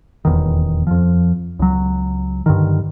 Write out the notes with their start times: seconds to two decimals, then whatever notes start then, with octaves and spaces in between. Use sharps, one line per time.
0.25 D#1 E2 D#3
0.87 F2 F3
1.59 C#2 F#3
2.46 G2 D3 D#3